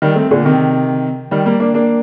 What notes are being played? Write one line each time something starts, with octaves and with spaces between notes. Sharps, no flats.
D#3 G3
A3 C4
A#2 D3
C3 D#3
D#3 G3
G3 A#3
A#3 D4
A#3 D4